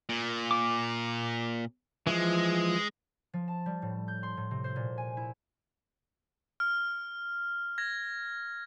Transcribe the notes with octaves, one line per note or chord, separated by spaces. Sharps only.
A#2
D6
E3 F3 G#3
F3
A5
G3
A2
G6
C6
A2
C3
C5
A#2
G#5
E4
F6
G#6 A#6